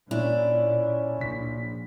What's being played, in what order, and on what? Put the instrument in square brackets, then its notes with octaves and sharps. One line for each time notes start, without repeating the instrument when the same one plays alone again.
[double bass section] A#2 [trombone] C#4 [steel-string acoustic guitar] D4 [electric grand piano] E4
[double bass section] A#1 [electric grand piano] B6